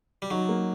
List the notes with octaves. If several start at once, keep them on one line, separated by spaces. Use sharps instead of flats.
G3
F#3 D#4
A#3